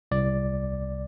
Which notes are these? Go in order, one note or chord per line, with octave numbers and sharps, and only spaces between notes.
C2 D5